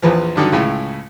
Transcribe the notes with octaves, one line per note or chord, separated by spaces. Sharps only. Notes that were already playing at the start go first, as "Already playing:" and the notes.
A#1 E2 E3 F3
G2 D3 D#3 F#3
C#2 A2 C#3